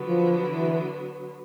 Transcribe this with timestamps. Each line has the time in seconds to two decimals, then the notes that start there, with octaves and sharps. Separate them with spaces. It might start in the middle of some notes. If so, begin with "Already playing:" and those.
Already playing: D3 F#3 B3
0.08 F3
0.50 E3